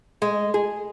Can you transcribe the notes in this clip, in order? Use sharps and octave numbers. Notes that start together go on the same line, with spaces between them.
G#3
G#4